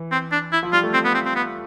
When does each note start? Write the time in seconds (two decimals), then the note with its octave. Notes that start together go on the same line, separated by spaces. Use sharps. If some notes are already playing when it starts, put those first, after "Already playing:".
Already playing: E3
0.11 C4
0.32 D4
0.52 E4
0.63 F3
0.73 G3 F4
0.83 A3
0.94 C4
1.05 B3
1.14 C4
1.25 C4
1.35 B3